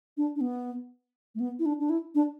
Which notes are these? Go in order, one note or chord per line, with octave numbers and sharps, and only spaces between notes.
D4
D4
B3
A3
B3
E4
D4
D4
E4
D4